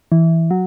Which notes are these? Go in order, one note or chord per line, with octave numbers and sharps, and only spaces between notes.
E3
F#3